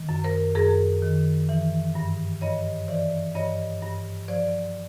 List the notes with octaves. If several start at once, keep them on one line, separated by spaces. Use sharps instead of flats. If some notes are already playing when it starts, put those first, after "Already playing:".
Already playing: D#3
F#2
A#4 C5
F#2 G#4 A#4
D#3
E3
G2
G2 C#5 D#5
E3 C5 D5
G2 C#5 D#5
G2
F3 C5 D5